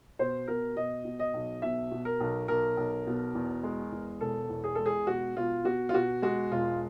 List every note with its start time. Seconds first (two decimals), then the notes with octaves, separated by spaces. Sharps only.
0.19 B2 C5
0.47 B2 A#4
0.76 B2 D#5
1.05 B2
1.19 D#5
1.34 B1
1.62 B2 E5
1.91 B2
2.05 A#4
2.20 B1
2.48 B1 A#4
2.77 B1
3.07 B2
3.35 E2
3.63 G#3
3.92 E2
4.21 E1 A4
4.50 E2
4.64 G#4
4.75 G#3 A4
4.86 G#4
5.07 B2 F#4
5.36 B2 F4
5.64 B2 F#4
5.89 F4
5.93 B2 F#4
6.22 G#3 F#4
6.51 E1 F4